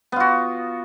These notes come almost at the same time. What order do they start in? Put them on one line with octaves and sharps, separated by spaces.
B3 F4 F#4